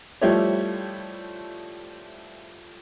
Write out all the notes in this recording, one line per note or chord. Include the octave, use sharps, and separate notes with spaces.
F3 G3 A3 E4 G4 C#5